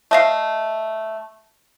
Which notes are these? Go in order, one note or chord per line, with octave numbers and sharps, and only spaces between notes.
A3 D#5 F5